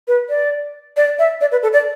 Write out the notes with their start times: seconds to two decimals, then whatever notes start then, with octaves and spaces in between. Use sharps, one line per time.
0.08 B4
0.29 D5
0.97 D5
1.19 E5
1.41 D5
1.52 B4
1.63 A4
1.73 D5